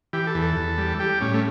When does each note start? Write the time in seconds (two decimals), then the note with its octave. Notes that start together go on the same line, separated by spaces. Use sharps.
0.13 E3 G4
0.27 A4
0.35 E2
0.42 A4
0.57 E2
0.78 G3
0.99 G3 G4
1.21 A2 C#4
1.34 A3